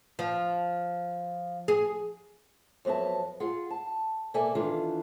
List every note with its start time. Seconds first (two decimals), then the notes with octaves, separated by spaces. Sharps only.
0.19 F3
1.68 G#4
2.85 F2 F#3 B3 E5 A5
3.40 F4 G#4 F#5
3.70 A5
4.34 B2 A#3 A4 D5 E5 G#5
4.55 D#3 E3 B3 D4 F4 A4